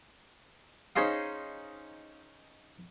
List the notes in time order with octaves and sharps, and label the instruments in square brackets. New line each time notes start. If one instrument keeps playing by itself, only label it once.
[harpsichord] C#4 D#4 G#4 C5 D#5 F5